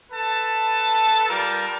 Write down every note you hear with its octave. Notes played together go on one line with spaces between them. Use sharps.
A4 B4 A5
G3 F4 A#4